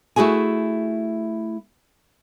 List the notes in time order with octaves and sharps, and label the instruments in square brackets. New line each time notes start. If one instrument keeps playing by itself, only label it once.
[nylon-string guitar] A3 E4 F#4 G#4 G#5